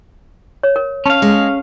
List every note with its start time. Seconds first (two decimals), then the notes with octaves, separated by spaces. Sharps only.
0.63 C#5
0.76 A#4
1.06 C#4 F5 A5
1.22 G#3